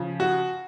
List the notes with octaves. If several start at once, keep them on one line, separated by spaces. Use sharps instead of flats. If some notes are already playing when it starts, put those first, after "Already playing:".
Already playing: C#3 F3
F#4